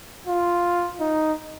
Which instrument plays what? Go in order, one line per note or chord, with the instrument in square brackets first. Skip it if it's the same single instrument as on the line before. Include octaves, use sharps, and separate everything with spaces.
[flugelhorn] F4
D#4